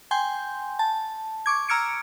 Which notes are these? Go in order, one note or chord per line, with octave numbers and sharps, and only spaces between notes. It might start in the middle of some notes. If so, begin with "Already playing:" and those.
G5 G#5 C6 G6
A5
C#6 D6 G#6
A#5 E6 F6 G#6 C#7 D7